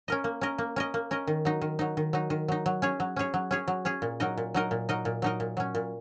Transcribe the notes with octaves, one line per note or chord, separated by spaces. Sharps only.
C#4 A#4 D#5
A#3
C#4 A#4 D#5
A#3
C#4 A#4 D#5
A#3
C#4 A#4 D#5
D#3
F#3 D#4
D#3
F#3 D#4
D#3
F#3 D#4
D#3
F#3 D#4
F#3
C#4 G#4 C#5
F#3
C#4 G#4 C#5
F#3
C#4 G#4 C#5
F#3
C#4 G#4 C#5
A#2
F#3 D#4 A#4 D#5
A#2
F#3 D#4 A#4 D#5
A#2
F#3 D#4 A#4 D#5
A#2
F#3 D#4 A#4 D#5
A#2
F#3 C#4
A#2